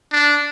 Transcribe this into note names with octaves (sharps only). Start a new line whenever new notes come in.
D4